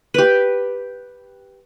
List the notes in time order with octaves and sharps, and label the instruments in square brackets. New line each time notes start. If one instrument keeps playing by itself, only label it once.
[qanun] G4 B4